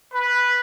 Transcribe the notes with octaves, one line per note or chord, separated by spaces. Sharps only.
B4